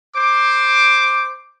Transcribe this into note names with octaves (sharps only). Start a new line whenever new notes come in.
C5 D6